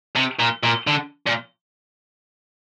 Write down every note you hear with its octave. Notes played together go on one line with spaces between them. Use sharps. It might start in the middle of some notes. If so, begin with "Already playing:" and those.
C3
A#2
A#2
D3
A#2